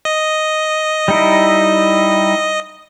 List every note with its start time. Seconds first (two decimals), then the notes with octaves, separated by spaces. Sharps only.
0.05 D#5
1.08 G3 D#4 E4